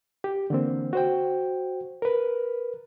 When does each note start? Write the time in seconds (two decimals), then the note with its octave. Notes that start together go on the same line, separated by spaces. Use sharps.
0.24 G4
0.50 D3 E3 A#3 C4
0.93 F#4 C5 G5
2.02 A#4 B4